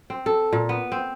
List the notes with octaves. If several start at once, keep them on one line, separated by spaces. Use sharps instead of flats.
C4
A4
A#2
B3
C4